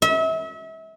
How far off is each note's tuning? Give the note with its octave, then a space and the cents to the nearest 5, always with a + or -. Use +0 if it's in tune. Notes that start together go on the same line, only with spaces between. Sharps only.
E5 -35